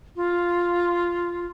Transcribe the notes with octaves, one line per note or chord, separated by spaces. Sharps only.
F4